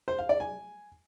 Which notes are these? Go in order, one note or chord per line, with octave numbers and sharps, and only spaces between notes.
C5
F5
D5
G#5